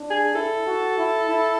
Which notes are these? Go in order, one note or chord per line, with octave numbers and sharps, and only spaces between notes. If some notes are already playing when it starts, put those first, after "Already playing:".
Already playing: D4
G#4
E4 A4
F#4
E4
E4